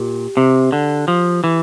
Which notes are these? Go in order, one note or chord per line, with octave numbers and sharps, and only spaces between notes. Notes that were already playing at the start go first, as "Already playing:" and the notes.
Already playing: A#2 G4
C3
D3
F3
E3